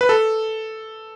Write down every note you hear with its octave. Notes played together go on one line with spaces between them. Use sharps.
B4
A4